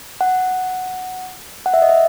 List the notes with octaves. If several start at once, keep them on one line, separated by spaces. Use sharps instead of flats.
F#5
F#5
E5
D#5
E5